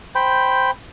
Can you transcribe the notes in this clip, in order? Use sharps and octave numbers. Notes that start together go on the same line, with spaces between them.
C5 G5 B5